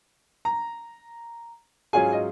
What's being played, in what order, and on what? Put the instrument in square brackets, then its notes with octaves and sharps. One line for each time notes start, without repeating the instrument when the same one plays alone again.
[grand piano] A#5
[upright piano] G#2 F#3 C#4 F4 G#4 [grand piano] G#5
[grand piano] D#5